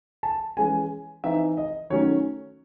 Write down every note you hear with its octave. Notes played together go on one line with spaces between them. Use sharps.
A5
E3 G#3 C#4 G#5
E3 C4 D#4 E5
D#5
D#3 F#3 A3 C#4 C#5